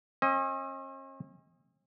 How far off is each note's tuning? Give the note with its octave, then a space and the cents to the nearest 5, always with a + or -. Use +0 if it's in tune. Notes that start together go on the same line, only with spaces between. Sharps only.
C#4 -45 D#5 +25